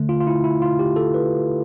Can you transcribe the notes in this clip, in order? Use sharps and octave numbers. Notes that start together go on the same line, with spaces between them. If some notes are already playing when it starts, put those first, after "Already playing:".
Already playing: D3 A3
F4
F4
E4
E4
F4
G4
A4
B4